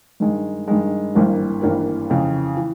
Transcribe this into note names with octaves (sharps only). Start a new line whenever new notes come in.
G2 D#3 G#3
G2 D#3 G#3
G#1 G2 E3 G3 A#3
G#1 G2 E3 G3 A#3
F2 C#3 E3
E3